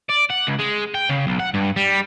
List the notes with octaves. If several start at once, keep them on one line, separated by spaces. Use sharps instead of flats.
D5
F#5
C#2
G#3
G5
C#3
B1
F#5
G2
G3